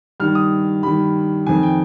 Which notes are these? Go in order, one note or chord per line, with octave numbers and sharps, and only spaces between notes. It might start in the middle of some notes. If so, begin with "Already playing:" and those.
G2 D#3 F6
D#6
G2 D#3 B5
F2 D#3 G#5
G5